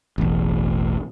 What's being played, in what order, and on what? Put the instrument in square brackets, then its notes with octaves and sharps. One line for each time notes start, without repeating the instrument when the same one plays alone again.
[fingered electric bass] E1 A1